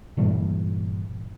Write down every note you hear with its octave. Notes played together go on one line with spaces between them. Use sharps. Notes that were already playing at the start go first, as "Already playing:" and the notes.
G2 A#2 E3 G3